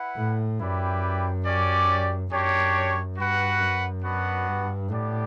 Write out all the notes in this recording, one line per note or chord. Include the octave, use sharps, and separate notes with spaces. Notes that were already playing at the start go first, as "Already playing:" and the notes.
Already playing: E4 B4 F#5
A2
F#2 E4 G4 B4 D5 G5
C#4 G4 D5
F#2 D4 G4 C#5
G2 F#4 B4 F#5
F#2
B3 D4 F#4 B4 F#5
G2
A2 B3 D4 G4 D5